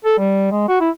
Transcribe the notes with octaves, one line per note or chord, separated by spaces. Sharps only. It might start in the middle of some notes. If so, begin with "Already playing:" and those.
A4
G3
G#3
F#4
E4